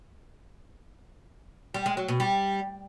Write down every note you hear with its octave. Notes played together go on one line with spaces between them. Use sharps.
G3
G#3
F#3
B2
G3